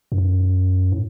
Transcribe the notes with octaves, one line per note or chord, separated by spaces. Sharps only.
F#2
A2